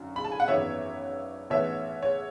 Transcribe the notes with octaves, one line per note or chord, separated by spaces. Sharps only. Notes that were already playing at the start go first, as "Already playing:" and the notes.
Already playing: G#1 F#2 D3
B5
A5
G#5
F#5
G#1 F#2 E3 B3 C#5 E5
A1 G#2 E3 B3 C#5 E5
C#5